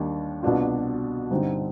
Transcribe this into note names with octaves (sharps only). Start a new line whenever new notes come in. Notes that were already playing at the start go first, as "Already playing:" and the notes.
Already playing: D#2 D#3 G3 D4
C2 B2 B3 D4 F4
G2 D3 G3 C4 D#4